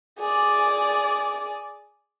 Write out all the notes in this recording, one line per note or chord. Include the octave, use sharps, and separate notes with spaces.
G#4 D5